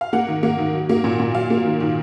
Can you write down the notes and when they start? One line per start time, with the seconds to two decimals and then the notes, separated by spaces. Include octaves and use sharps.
0.01 F5
0.13 A#3 F#5
0.28 D#3
0.43 A#3
0.58 D#3
0.74 F#3
0.89 A#3
1.04 A#2
1.20 A#2
1.35 F#3 F5
1.50 A#3
1.65 D#3
1.80 D#3